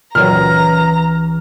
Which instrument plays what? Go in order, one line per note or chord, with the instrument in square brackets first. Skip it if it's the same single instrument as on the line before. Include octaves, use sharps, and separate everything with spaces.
[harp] C#2 E3 [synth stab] A#2 D#3 F#3 [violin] A#5 [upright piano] F6